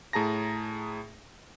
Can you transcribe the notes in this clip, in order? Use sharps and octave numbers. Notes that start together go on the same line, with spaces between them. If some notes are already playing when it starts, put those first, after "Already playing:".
A2 G#4 A5 A#5 A#6